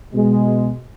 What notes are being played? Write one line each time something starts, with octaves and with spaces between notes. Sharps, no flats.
B2 G#3